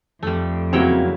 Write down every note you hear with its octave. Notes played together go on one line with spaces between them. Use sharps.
F2 G3 A3
C#3 F#3 A#3 C4 E4 C#5 G5